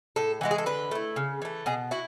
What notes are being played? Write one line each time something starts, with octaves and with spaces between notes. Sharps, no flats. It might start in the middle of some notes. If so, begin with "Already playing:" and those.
A2 A4
E3 G#3 F#4
G#4
A4
D3 B4
A3 E4
C#3
E3 A3
B2 G#4
E4 F#4